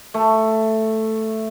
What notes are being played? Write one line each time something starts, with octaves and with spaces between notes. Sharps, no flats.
A3